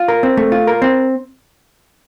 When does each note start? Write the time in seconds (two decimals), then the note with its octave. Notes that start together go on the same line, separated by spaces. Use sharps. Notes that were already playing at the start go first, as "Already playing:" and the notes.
Already playing: F4
0.08 A#4
0.23 C4
0.37 A3
0.52 F4
0.67 A#4
0.82 C4